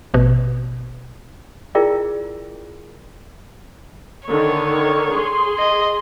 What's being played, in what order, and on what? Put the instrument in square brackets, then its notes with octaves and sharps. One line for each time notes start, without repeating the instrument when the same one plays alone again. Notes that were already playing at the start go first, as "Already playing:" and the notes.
[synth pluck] A1 B2
[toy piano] E4 F4 G#4 A#4 D5 G5
[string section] D3 D#3 [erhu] C#5
[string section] G#4 C6
[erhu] D#5